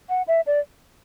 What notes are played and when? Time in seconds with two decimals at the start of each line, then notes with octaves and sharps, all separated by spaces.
0.09 F#5
0.28 E5
0.47 D5